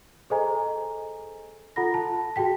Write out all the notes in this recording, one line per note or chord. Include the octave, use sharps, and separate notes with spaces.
G#4 A4 C5 D#5 G#5 A#5
F4 A4 F#5 A#5 B5 A#6
A5
F#4 G#4 G5 B6